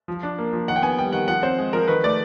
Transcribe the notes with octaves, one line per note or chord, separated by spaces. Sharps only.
F3
D4
A#3
F3
D#3 F#5
G5
B3 G#5
G3 G5
D#3 F#5
F3 F#5
C4 C5
G#3
F3 A#4
D#3 B4
A3 D5